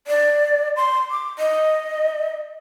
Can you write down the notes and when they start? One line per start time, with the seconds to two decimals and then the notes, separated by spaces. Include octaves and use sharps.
0.07 D5
0.76 C6
1.11 D6
1.39 D#5